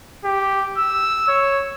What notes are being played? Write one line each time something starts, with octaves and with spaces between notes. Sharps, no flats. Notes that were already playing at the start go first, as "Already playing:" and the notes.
G4
E6
C#5